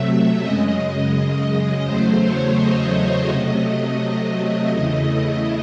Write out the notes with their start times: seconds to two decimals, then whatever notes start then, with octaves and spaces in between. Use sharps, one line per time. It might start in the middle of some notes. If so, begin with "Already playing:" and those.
Already playing: C3 F#3 A3 E5
0.41 F#2 C#3 G#3 D#5
1.84 E2 C#3 F#3 A3 C5
2.21 C#5
2.57 D#5
3.29 C3 F#3 A3
4.72 E2 C#3 E3 A3